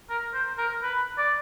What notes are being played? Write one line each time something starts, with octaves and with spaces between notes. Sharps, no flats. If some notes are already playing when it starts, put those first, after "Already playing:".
A#4
C5
A#4
B4
D5